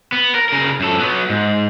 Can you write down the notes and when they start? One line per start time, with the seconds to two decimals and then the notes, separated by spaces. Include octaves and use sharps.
0.12 B3
0.35 A#4
0.49 C#3 A#4
0.80 F#2 A4
0.99 F#3 B3
1.30 G#2